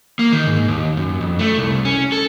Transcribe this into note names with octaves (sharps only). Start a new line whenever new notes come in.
A#3
D#3
G#2
D#2
F#2
F2
A3
C2
C#4
A4